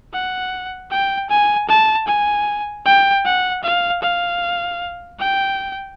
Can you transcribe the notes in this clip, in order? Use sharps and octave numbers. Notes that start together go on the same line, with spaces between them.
F#5
G5
G#5
A5
G#5
G5
F#5
F5
F5
G5